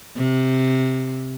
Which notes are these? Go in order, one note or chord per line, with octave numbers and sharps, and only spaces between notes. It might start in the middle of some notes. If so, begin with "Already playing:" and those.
C3